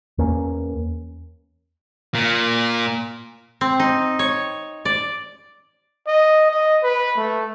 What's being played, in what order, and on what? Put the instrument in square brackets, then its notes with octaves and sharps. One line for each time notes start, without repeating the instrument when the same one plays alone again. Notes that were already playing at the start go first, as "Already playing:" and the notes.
[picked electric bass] E2 A#3 C#4
[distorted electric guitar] A#2
[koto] C4
D#4
C#5
D5
[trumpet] D#5
D#5
B4
A3